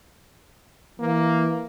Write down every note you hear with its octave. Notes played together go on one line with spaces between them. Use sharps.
E3 A#3